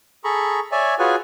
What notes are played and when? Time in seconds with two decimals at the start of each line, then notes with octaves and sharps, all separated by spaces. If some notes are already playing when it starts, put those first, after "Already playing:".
0.24 G#4 A4 A#5 B5 C#6
0.72 C#5 D5 E5 G#5
0.99 F4 F#4 G#4 B4 C#5 G#5